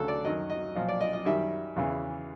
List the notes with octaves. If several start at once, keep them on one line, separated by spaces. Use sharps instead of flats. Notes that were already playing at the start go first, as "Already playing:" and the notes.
Already playing: D2 C#3 F#3 A4
D5
F#2 D#3 F#3 D#5
D#5
B1 A#2 F3 D#5
D5
D#5
D#5
F#2 D#3 G3 E5
E2 C#3 E3